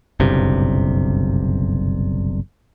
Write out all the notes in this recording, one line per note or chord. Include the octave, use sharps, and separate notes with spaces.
F#1 B1 G2 C3